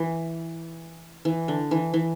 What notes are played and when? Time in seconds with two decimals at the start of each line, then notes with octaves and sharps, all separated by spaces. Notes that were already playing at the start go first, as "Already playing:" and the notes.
Already playing: E3
1.25 E3
1.48 D3
1.71 E3
1.94 E3